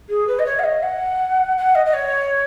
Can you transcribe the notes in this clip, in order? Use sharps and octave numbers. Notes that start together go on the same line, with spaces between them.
G#4
B4
D#5
C#5
F#5
D#5
F#5
F#5
D#5
D#5
C#5